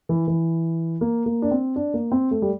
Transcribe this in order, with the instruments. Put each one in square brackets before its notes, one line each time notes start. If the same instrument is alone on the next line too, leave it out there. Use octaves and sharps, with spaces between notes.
[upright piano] E3
E3
A#3
A#3
D4
C4
D4
A#3
C4
A3
G3